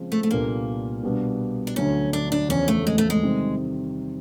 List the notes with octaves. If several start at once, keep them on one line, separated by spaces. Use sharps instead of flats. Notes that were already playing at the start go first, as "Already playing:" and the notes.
Already playing: C#3 F3 G#3 C4
A3
A3
C2 A#2 G3 A#3 B3 D4
B2 G3 B3 D4
D4
D2 D3 F#3 A3 C#4
D4
D4
E2 C#3 F3 C#4
A3
G#3
A3
G#3
C3 D#3 G3 C4